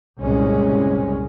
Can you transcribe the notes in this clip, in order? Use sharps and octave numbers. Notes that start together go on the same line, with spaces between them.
F#1 C2 A#2 G#3 C#4